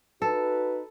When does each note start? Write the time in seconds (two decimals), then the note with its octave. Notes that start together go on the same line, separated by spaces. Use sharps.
0.22 D#4 F#4 A4 B4